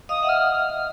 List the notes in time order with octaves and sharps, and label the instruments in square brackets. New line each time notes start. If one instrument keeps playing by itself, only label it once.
[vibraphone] D#5 F5 [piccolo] D#6
[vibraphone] E5 F#5
[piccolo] F6